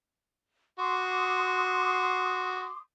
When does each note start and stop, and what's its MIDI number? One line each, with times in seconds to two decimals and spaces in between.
0.79 2.67 66
0.79 2.78 84
0.79 2.78 86
0.79 2.78 87